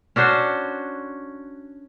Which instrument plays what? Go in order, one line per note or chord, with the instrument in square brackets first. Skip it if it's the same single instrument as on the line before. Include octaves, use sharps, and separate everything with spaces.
[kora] C#4 D4 F#4 C5